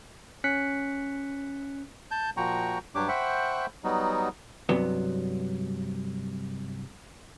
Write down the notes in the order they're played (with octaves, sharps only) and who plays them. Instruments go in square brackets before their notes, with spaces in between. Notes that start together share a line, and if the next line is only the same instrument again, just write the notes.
[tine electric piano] C#4 F#6 B6 C#7
[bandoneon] A5 G6
A#2 F3 F#4 G5 A#5 C#6
G2 F#3 D4 G4 C#5 D6
C5 E5 F#5 G5 B5 C#6
F#3 G3 B3 D#4 F#4
[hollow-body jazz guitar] C2 G2 C3 F#3 B3